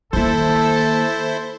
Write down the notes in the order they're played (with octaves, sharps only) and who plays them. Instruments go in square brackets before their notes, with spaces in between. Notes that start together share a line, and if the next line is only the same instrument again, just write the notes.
[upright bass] D#3 A#3 [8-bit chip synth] E4 C5 [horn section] A4